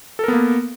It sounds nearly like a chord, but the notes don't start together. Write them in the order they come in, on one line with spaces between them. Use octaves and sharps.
A4 A#4 B3 A#3